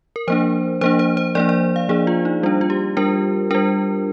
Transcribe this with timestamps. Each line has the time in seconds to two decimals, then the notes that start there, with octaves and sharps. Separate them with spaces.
0.16 A#4
0.28 F3 A#3 D4 C5
0.81 F3 A#3 D4 C5
0.99 C5
1.17 C5
1.35 F3 A#3 D4 D5
1.49 D5
1.76 F5
1.89 F3 A#3 D4 G#4
2.07 F4
2.25 D#4
2.43 G3 D4 F4
2.61 F4
2.70 G4
2.97 G3 D4 A#4
3.51 G3 D4 A#4